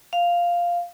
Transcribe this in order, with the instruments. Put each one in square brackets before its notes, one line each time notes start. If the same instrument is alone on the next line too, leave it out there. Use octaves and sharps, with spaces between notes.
[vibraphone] F5